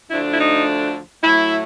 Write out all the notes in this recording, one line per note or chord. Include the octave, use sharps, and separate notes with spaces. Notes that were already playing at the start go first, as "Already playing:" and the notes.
D2 D3 F3 A3 D4 E4
E4
D#4
A2 F#3 A3 E4